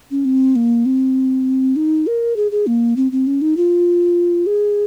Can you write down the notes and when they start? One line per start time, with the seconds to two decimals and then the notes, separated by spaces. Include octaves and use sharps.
0.11 C#4
0.25 C4
0.56 A#3
0.86 C4
1.76 D#4
2.07 A#4
2.36 G#4
2.52 G#4
2.67 A#3
2.96 C4
3.12 C4
3.27 C#4
3.41 D#4
3.57 F4
4.46 G#4